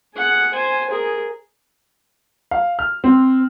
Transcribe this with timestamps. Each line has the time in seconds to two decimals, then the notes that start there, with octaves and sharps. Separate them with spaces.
0.15 G#4 F#5
0.53 C5 G#5
0.90 G#4 A#4
2.51 F5
2.79 F6
3.04 C4